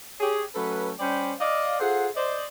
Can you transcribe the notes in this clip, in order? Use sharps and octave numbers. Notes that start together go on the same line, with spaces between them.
G4 G#4 C#5
F#3 A3 C#4 A4 B4
G3 C#4 C5 D5 G5 B5
D5 D#5 F5
F4 G#4 A4 C5 F#5
C5 D5 D#5